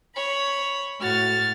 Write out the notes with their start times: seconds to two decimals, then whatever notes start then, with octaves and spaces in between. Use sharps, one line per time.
0.15 C#5 B5
1.00 A2 F#4 F6 A6